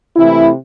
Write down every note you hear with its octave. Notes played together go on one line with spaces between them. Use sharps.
C3 E3 A3 E4